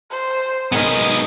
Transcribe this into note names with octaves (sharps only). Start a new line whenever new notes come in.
C5
G#3 B3 D#4 A#4 D#6